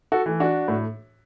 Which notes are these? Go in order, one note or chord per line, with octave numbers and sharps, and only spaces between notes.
F#4 A4
E3 A3
D4 F#4
A2